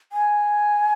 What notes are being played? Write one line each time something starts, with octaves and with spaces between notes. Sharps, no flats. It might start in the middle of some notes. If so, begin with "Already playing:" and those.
G#5